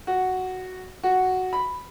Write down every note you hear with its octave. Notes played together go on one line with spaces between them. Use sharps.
F#4
F#4
B5